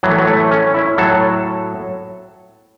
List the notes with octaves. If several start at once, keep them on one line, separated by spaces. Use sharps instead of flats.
A2 E3 F#3
A3
F#3
A3
C#4
E4
A2 F#3 A4